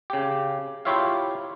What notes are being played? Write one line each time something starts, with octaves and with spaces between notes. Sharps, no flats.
C#3 G4
E4 F4 G4 C#5 E5 F5